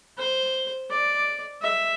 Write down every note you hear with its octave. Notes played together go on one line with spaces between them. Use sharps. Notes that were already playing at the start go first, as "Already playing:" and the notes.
C5
D5
E5